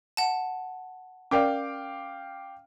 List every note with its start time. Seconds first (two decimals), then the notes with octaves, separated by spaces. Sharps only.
0.17 F#5 A5
1.31 C#4 A#4 D5 F5 G5 D6